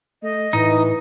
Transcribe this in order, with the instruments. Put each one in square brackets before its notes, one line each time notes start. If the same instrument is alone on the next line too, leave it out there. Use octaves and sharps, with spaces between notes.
[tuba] A3 [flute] D#5
[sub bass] A2 [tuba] E3 [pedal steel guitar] D#4